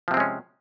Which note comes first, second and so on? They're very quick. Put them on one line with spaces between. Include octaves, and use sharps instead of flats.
F3 C3 C4 G#3 C#4